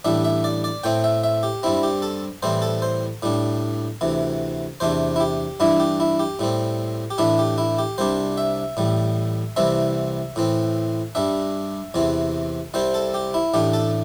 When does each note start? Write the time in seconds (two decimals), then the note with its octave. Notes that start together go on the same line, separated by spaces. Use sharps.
0.05 A1 A2 G3 D4 E5
0.25 E5
0.44 D5
0.64 D5
0.84 A2 A3 C4 G5
1.04 E5
1.23 E5
1.43 G4
1.63 G2 G3 C4 E4
1.83 G4
2.02 A4
2.43 A2 E3 G3 C4 C5
2.62 A4
2.82 C5
3.22 A2 G3 D4
4.01 D2 C3 E3
4.80 E2 C3 A3 D4 C5
5.16 E4
5.20 G4
5.60 G2 E3 A3 D4 E4
5.80 G4
6.00 E4
6.19 G4
6.39 A2 G3 C4
7.10 G4
7.18 A2 E3 A3 D4 E4
7.39 G4
7.58 E4
7.78 G4
7.98 C2 C3 G3 D4 C5
8.38 E5
8.77 A1 A2 G3
9.56 C2 C3 E3 G3 C4 E5
10.36 A2 E3 C4
11.15 G2 G3 D4 E5
11.94 E2 C3 E3 C4
12.74 C2 C3 G3 C4 C5
12.94 A4
13.14 G4
13.34 E4
13.54 A1 A2 A3 D4 G4
13.73 A4